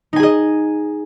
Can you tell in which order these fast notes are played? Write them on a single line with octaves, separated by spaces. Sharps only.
D#4 G#5 G#4 D#5